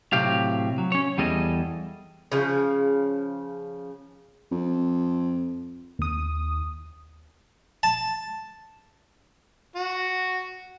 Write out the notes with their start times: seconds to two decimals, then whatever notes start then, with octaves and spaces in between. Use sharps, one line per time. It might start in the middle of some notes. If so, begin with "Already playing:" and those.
0.13 A2 C3 F#3 G4 F5
0.78 F#3
0.92 C#4 C#5
1.18 E2 G3 G#4 A4 D#5
2.32 C#3 F3
4.52 F2
5.99 D#2 D#6
7.83 A5
9.76 F#4